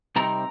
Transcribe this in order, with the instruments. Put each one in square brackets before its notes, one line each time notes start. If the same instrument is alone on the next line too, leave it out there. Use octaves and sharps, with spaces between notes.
[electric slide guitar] C3 G3 C4 D#4 A#4 A#5